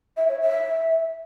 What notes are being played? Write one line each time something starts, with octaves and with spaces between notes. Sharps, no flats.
E5
C#5
E5